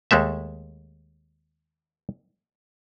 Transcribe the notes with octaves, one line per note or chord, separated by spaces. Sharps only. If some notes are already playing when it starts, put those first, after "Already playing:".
D#2 G#3 A3 E5